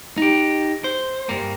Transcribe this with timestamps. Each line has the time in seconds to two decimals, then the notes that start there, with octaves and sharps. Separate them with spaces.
0.18 D#4 G4
0.84 C5
1.29 G2 A#3